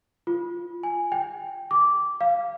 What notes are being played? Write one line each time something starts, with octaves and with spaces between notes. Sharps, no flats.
F4
G#5
G5
D6
F5